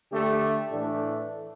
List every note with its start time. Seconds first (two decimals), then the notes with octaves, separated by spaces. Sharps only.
0.11 D3 A3 G4
0.72 A2 E3 A3 D4